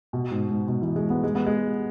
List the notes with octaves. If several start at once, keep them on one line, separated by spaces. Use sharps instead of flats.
B2
G#2
G#2
B2
E3
G#3
B3
G#3
B3
G#3